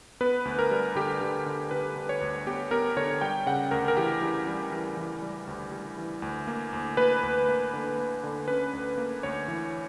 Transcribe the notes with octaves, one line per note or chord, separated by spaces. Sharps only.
B3 B4
D2
A#4
G3
D3 G4
D3
D3
D3 B4
D3
C#5
D2
B3 G4
B3 A#4
D3 C#5
G3 G5
C#3 F#5
D2 A#4
A#4
E3 G4
E3
G3
E3
E3
G3
D2
G3
E3
D2
A#3
D2
A#3 B4
D2
A#3
D3
A#3
D3
C#4 B4
D2
A#3
D2 C#5
E3